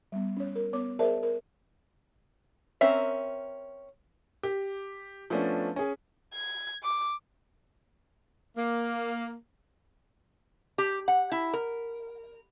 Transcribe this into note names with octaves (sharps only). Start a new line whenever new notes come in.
G3 B3
C#4 C#5
A#4
B3 C#5 D6
G#4 A#4 C5 D5 E5 A5
A#4
C4 C#4 A#4 E5
G4
F3 A3 B3 C#4 D4
C#4 G#4
G#6
D6
A#3
G4
F#5
E4
A#4